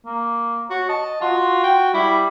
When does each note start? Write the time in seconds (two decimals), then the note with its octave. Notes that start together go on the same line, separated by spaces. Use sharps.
0.06 A#3
0.70 F#4 C#5
0.89 D#5 A5
1.21 F4 F#4
1.63 G5
1.94 G3 E4